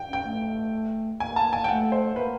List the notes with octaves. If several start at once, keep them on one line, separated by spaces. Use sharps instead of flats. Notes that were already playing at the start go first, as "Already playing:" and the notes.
Already playing: G5
C#4
G5
A3
A#3 G#5
A5
G#5
G5
A3 F#5
C5
A#3 B4